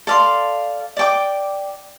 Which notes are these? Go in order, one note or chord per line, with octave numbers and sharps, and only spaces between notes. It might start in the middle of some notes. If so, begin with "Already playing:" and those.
A4 D5 F5 C6
D5 G5 D6